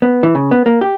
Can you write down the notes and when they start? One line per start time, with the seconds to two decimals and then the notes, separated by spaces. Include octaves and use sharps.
0.02 B3
0.23 E3
0.35 C#3
0.51 B3
0.66 A#3
0.81 G4